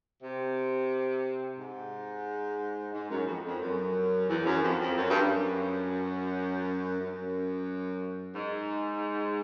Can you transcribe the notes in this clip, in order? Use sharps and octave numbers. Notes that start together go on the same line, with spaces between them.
C3
G#2
G#2
F#2
F2
F2
F#2
E2
F#2
F2
F2
F#2
G2
F#2
F#2
G#2